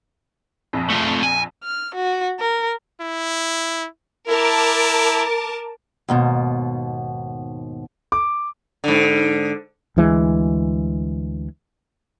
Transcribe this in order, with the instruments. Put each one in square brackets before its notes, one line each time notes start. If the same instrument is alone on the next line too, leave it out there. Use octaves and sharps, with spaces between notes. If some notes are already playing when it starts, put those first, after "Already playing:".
[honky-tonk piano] A#1 F2
[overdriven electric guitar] A3 F4
G#5
[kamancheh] F6
F#4
A#4
[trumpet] E4
[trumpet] E4 [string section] A#4 A5 D6
[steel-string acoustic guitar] D#2 G#2 B2
[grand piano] D6
[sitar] G#2 D3
[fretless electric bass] D2 E3 G#3